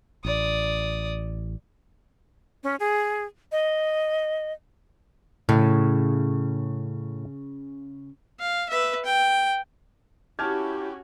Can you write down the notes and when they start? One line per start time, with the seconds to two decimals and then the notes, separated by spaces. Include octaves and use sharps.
0.25 A1 D5 D#6
2.63 C#4
2.80 G#4
3.52 D#5
5.49 A2 C#3
8.40 F5
8.69 B4 E5
9.05 G5
10.39 C#4 E4 F#4 G4 A5 F6 G#6